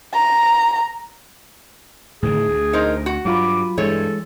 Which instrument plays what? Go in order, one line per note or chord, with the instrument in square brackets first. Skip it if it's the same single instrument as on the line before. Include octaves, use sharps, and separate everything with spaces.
[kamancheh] A#5
[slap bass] A2 D3 D#3 [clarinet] G#4
[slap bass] D2
[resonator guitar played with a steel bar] D#4 A#4 C5
F#4
[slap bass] G2 [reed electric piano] F#3 F4 B5 [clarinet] D6
[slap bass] G2 [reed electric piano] E3 G#3 [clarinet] A4 [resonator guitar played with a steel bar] C#5